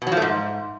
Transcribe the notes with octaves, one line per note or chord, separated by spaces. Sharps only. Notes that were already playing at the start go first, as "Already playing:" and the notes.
B2
F#3
F3
A3
G#2